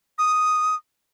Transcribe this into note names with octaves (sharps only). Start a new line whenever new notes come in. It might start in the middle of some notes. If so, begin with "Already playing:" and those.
D#6